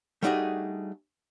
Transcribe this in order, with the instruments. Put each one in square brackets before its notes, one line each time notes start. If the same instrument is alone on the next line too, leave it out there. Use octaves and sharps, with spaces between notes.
[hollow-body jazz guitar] G3 A3 D4 D#4 F#4 G#4